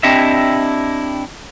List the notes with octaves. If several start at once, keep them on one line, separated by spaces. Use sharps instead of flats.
C4 D4 E4 G4 D#5 E5